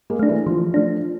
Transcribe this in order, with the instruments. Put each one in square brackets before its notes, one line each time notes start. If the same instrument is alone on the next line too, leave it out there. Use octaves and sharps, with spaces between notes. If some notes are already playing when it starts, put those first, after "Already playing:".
[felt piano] G#3 A#3
[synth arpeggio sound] A3 D4
[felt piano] E3
[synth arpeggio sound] E3 [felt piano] F3
[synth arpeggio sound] A3 D4